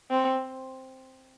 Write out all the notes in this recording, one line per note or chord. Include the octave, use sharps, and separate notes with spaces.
C4